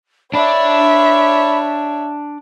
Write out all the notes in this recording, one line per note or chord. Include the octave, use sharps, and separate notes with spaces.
D4 C#5 D5 E5 B5